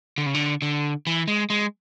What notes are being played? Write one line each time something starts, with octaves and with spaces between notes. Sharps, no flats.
D3
C#3
D3
D3
E3
G#3
G#3